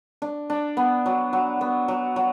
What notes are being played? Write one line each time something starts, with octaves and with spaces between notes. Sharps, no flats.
D4
D4
B3
F#3
F#3
B3
F#3
F#3